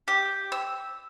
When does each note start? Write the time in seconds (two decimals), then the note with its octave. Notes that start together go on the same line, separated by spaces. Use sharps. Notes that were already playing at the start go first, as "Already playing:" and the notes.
0.08 G4
0.52 E6